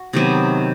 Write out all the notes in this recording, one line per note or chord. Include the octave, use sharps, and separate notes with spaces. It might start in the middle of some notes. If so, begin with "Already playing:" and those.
Already playing: F#4
C3 D#3 F#3 B3